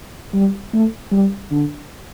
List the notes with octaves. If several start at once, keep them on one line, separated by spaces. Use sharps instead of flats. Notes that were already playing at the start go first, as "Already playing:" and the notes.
G3
A3
G3
D3